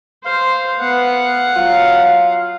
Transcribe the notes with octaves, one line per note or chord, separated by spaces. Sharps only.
C5 F5
B3 F#5
F#3 F4